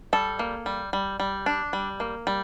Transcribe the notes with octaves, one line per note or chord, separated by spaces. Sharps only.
G3 A4
A#3
G3
G3
G3
D4
G3
A#3
G3